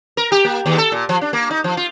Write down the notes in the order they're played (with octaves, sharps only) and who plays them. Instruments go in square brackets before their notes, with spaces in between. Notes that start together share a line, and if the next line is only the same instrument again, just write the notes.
[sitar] A#4
G4
A#3
D#2
A4
A#2
F3
D4
A#3
D#4
F3
F4